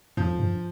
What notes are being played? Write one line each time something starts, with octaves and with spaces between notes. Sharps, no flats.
F2 F3
G2